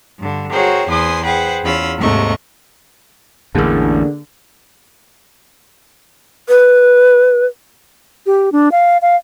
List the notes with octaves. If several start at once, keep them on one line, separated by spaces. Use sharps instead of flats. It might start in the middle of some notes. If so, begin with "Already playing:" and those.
G2 D3
F#4 G#4 A#4 C5 C#5 G5
E2 B4 C5 G#5 C6 D#6
G#4 B4 C5 F#5 G5
E2 C#4 F4 B5 E6
D#2 G#2 C3 A3 D#5 C#6
A1 E2 D3 A#3 G#4
B4
G4
D4
F5
F5